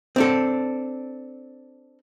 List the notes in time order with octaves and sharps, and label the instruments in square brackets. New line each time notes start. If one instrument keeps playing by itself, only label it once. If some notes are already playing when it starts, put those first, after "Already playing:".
[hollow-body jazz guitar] C4 D4 A4